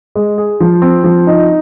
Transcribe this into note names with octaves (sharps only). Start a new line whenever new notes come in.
G#3
G#4
F3
C4
F3
D#4